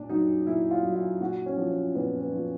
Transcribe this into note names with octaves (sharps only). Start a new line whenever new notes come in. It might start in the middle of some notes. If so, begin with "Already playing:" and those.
Already playing: A#2 D4
F#3 D#4
A#2 E4
F4
F#3
F4
A#2 F#4
C#4
F3
C4
A#2 B3
B3
F3